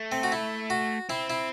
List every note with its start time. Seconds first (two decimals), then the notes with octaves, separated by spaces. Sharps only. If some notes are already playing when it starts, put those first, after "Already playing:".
Already playing: A3
0.12 C4
0.23 F#4
0.32 E4
0.70 F#4
1.09 C4 E4
1.30 E4